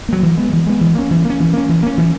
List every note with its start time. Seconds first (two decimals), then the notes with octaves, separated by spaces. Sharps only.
0.09 F#3 A#3
0.23 E3
0.37 G#3 B3
0.53 E3
0.67 G#3 B3
0.81 E3
0.95 A#3 C#4
1.11 E3
1.25 A#3 C#4
1.40 E3
1.53 A#3 C#4
1.69 E3
1.83 A#3 C#4
1.98 E3